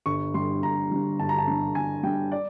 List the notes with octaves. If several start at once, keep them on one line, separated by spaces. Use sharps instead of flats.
G1 C#6
G2 D3 G3 C6
G1 A#5
G2 D3 G3
G1 A5
A#5
A5
G2 D3 G3
G1 G#5
G2 D3 G3 G5
D5